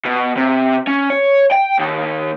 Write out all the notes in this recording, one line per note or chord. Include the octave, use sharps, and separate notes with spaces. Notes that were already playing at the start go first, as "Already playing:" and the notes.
B2
C3
C#4
C#5
G5
D#2